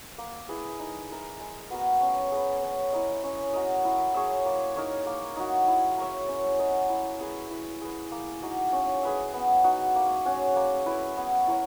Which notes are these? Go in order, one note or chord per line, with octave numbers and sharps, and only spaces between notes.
A#3
E4 G#4 B4
D#4
A#4 E5
G#3
B3 F#4 A#4
C#4
G#4 B4
C#4
E4 A#4 D#5
C#4
F#4 A#4 D#5
E4
G#4 C#5 E5
A#3
D#4 A#4 C#5
A#3
D#4 F#4
E4
A#4 C#5 E5
C#4
F#4 A#4 D#5
E4
G#4 B4 E5
E4
G#4 B4
A#3
D#4 F#4
C#4
G#4 B4 E5
B3
D#4 F#4
A#3
C#4 F#4
A#3
E4 B4
B3
E4 A#4 C#5